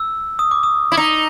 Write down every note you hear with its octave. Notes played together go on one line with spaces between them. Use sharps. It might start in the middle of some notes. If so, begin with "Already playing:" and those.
Already playing: E6
D#6
D6
D#6
E4
D#4